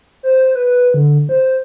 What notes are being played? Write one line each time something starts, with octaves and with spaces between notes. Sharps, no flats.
C5
B4
D3
C5